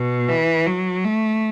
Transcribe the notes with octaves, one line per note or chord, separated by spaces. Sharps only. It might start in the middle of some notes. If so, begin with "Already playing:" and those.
Already playing: B2
E3
F#3
A3